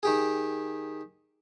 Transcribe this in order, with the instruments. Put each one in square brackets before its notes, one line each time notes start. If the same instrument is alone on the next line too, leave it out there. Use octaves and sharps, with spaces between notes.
[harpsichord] D#3 G4 G#4